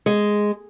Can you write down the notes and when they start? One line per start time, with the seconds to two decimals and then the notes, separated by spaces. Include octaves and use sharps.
0.06 G#3